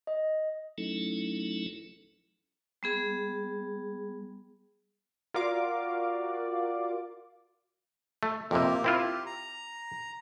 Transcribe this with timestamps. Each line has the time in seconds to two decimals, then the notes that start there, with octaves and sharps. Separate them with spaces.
0.07 D#5
0.78 F#3 A3 C#4 D#4 E4 A4
2.83 G3 B3 G#4
5.34 F4 F#4 A#4 D5 F5 D6
8.23 A3
8.51 F2 C3 A#3 G4 A#4
8.84 C4 E4 F4 G4
9.26 A#5